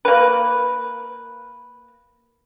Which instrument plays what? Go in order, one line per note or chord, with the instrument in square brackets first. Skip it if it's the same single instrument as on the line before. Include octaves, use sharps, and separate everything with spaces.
[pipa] A#3 B4